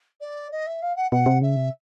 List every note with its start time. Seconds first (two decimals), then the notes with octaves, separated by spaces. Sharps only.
0.21 D5
0.52 D#5
0.67 E5
0.82 F5
0.96 F#5
1.11 B2 F#5
1.26 C3
1.42 C#3 E5
1.56 C3